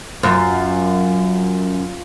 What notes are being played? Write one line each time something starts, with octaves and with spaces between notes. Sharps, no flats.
F#2 F4